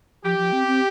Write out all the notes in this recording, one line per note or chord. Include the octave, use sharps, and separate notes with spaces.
F3 G4
F3
C4
C4